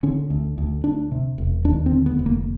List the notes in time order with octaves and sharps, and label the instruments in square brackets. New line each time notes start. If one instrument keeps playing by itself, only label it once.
[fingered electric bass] D3 C#4
D2
D2
D2 D4
C3
E1
D#2 D4
C4
D3
B3
F1
A#3